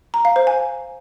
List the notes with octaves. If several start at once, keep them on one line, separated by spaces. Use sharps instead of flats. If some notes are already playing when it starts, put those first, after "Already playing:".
A#5
F5
C5
G#5